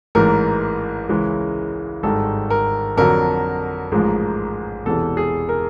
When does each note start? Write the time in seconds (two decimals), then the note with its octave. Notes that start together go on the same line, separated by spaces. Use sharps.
0.15 A1 G#2 E3 A#4
1.09 C#2 C#3 E3 G#3 C#4
2.03 G#1 G2 D#3 G#3 A4
2.50 A#4
2.97 F2 D3 F#3 A#4
3.92 A1 G#2 F3 G#3
4.86 E1 E2 C3 E3 A4
5.17 G#4
5.49 A#4